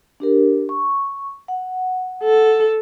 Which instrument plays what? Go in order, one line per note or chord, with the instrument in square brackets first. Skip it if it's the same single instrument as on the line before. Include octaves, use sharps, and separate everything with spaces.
[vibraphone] D4 G4 A#4
C#6
F#5
[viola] A4